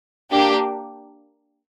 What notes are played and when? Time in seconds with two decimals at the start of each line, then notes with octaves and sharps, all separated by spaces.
0.31 A#3 D4 G4